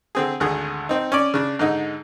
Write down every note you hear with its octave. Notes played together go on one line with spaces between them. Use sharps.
D3 C4 G#4
G#1 D2 D3 G#4
C4 D#4
C#4 D5
C#3 D4
G#2 D3 D#4